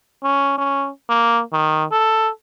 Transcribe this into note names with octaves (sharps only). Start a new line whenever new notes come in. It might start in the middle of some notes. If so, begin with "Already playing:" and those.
C#4
C#4
A#3
D#3
A4